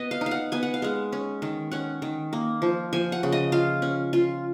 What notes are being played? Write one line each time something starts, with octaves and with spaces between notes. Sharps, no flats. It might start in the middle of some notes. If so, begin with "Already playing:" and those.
Already playing: B3 D#5
F5
D#4
F5
F#5
B3 G#5
F#5
F5
G#3 F#5
C#4
D#3
C#4 F#5
D#3
A#3
F3
F3 G#5
F#5
C#3
D#5
F4 F5
C#4
F4